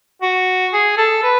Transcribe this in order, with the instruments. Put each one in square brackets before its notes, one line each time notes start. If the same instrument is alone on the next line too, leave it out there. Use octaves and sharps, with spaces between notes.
[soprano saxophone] F#4
G#4
A4
B4